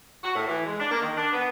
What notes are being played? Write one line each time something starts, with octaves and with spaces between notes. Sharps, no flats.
F#4
A2
E3
G#3
D4
A#3
D#3
D4
B3